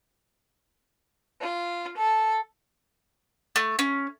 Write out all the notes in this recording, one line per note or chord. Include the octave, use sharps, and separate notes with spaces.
F4
A4
A3
C#4